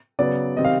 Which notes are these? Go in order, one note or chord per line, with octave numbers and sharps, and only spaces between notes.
C#3 F#3 B3 D5
C3 D#3 G3 C4 D#5
F5